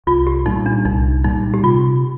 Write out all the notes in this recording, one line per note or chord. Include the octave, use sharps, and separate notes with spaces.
C2 F4
G4
A#2 G3 D#4
D4
C2 D#4
A#2 G3 D#4
G4
C3 F4